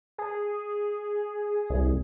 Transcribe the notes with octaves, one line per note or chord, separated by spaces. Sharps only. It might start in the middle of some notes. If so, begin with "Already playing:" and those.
G#4
C2